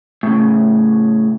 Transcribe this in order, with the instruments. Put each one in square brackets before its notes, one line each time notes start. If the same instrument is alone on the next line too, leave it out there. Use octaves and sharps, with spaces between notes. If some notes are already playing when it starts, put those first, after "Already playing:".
[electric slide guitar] A2 C#3